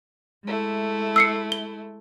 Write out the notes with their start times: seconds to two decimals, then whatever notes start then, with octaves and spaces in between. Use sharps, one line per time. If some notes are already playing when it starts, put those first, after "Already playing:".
0.44 G#3 A3 E4
1.16 E6 C7 C#7
1.52 G7